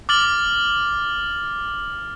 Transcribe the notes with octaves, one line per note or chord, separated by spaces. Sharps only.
D6 F6 A6 F#7